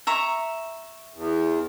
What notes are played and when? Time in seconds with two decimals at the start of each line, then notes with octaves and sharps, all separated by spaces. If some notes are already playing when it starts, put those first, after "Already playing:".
0.07 E5 A#5 C#6
1.15 E2